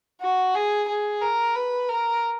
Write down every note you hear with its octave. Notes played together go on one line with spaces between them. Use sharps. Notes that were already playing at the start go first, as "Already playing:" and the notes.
F#4
G#4
G#4
A#4
B4
A#4